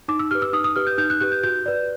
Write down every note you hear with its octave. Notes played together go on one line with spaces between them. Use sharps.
D#4 D6
E6
G4 B4 F6
E6
D#4 D#6
D#6
G4 B4 F6
G6
D#4 G6
F#6
G4 B4 F#6
G6
F#4 G6
B4 D5